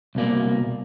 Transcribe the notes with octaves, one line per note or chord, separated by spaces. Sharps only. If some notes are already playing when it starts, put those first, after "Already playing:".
C2 B2 A#3 D5